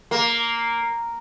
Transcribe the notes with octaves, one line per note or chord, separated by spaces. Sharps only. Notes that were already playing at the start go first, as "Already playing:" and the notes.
A#3